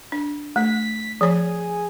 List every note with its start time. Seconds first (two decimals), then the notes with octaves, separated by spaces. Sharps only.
0.12 D4
0.56 A3 B6
1.21 F3 G#4 C#5